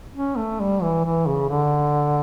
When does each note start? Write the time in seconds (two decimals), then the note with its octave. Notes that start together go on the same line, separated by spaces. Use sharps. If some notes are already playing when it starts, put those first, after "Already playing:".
0.15 C#4
0.37 A3
0.60 G3
0.82 E3
1.04 E3
1.26 C#3
1.49 D3